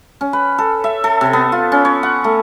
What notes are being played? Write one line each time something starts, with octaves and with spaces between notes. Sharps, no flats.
C#4
B4
A4
E5
A4
C3
B3
F4
C#4
C#5
F#5
A3